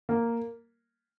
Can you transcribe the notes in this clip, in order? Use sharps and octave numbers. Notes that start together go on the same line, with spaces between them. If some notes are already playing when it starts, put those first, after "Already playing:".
A#3